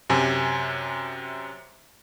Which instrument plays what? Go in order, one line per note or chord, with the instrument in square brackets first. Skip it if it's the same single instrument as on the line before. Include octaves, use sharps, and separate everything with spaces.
[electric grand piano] F#2 C3 G#5